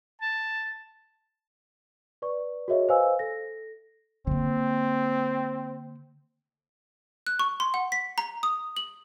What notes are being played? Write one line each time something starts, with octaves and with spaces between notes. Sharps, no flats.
A5
B4 D5 C#6
F#4 G#4 A#4 C#5 D#5 E5
B4 C5 D#5 F5 G#5 E6
A4 A#6
D3 A#3 C4
F#6
C#6
C6
F#5
B6
A#5
D#6
F#7